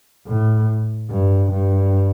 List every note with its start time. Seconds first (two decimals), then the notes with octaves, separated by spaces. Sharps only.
0.27 A2
1.10 G2
1.52 G2